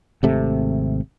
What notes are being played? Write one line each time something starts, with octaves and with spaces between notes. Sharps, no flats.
G#1 C3 A3